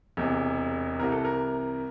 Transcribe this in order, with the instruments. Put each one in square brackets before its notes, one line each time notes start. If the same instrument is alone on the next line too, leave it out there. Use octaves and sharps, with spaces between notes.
[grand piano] E1 E2 C3
C2 C3 E3 A#4
A4
A#4